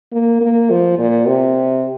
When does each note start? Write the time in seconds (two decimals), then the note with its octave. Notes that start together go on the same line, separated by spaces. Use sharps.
0.12 A#3
0.41 A#3
0.70 F3
0.99 A#2
1.27 C3